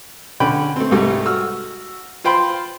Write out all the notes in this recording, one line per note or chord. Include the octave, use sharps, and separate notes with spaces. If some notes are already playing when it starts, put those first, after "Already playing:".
D3 C#4 G5 B5
A3 C4
C2 G#2 G3 A3
F#4 E6 F6
F4 C5 G5 B5 C6